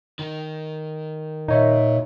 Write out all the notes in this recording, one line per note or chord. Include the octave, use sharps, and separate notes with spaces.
D#3
A#2 D#4 C#5 E5